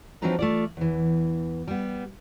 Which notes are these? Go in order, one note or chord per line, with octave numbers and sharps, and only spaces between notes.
F3 F#3 C4 D4 D#4 B4
A3 F4 D5
E2 E3
G3 B3